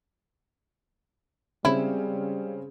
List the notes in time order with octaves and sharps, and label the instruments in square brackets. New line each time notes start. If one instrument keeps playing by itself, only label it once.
[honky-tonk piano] C#3 C4 C#4 [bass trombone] G3 [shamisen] E4 [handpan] G#4